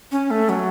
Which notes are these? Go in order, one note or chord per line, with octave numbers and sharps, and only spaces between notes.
C#4
A3
F#3